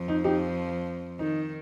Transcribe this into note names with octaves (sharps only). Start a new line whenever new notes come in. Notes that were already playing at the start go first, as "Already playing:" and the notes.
Already playing: F2 F3
D#4
D#4 G4
D#3 D#4